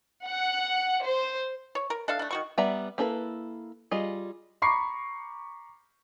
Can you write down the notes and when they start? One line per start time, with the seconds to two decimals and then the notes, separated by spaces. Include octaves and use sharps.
0.25 F#5
1.05 C5
1.75 C#5
1.90 A#4
2.08 D4 A4 E5 F5
2.19 A3 D4
2.31 D#3 F#4 C#6
2.58 G3 B3 D5 E5 A#5
2.98 A#3 D4 E4 A4 B4
3.91 G3 F4 G#4 D#5
4.62 A#5 B5 C#6 D6 C7